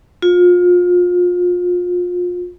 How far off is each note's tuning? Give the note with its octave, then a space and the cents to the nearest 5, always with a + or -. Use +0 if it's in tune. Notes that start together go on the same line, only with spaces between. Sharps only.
F4 +30